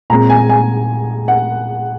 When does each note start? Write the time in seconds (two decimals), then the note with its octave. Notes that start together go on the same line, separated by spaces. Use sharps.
0.10 A#2 G#3 C4 A#5
0.30 G#5
0.49 G#5
1.28 F#5